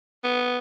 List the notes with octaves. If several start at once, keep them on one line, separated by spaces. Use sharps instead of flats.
B3